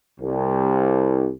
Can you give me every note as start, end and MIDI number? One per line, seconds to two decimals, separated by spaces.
0.21 1.29 36